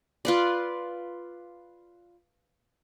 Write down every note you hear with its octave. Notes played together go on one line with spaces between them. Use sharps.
F4 B4 D5